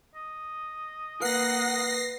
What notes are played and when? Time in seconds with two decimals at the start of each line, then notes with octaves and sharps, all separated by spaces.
0.15 D#5
1.21 A#3 B4 F#5 A#6 C7